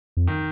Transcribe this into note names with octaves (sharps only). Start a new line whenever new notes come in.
F2
D#3